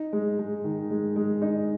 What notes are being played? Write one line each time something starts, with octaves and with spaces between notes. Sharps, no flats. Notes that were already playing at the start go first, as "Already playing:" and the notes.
Already playing: D#4
G#3
G#3
D#3
G#3
G#3
D#4